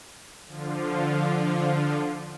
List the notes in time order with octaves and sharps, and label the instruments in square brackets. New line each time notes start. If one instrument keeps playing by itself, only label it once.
[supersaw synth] D3 F3 F4